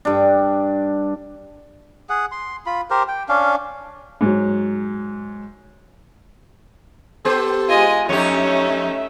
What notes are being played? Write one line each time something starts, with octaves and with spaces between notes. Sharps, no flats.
G2 D4
G#4 F#5
C6
F4 B5
G4 A#4 C5
G5
C#4 D4 F5
G#2 F#3
B3 G4 A4 C5
G#3 F4 D#5 G#5
F2 A3 C#4 D#4 G4 C#5 E5